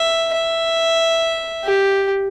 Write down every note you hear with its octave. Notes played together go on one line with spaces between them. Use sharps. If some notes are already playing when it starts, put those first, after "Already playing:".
Already playing: E5
E5
G4